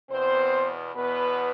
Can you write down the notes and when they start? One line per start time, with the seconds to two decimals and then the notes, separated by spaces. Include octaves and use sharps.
0.10 E2 B2 C4 C5
0.95 E2 B2 B3 B4